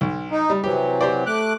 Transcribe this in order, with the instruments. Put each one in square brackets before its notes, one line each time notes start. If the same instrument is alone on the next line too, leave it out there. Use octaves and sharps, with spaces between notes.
[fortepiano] B1
[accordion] D#4
[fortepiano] G3
[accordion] C3 E3 F#3 [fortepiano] G4
[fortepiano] G4 C5 D5
[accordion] A3 D6 F#6